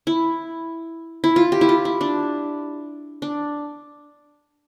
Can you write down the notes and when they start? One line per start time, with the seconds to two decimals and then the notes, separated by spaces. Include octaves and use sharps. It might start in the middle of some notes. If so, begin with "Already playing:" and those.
0.07 E4
1.24 E4
1.36 F4
1.52 G4
1.61 E4
1.69 F4
1.85 E4
2.01 D4
3.22 D4